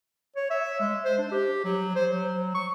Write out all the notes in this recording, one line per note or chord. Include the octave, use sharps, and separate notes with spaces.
C#5
E5
G#3
C5
D4
G4
F#3
C5
F#3
C#6